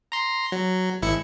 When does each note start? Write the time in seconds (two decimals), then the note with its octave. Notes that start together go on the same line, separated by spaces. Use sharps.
0.12 A#5 C6
0.52 F#3
1.02 G#1 E4 C#7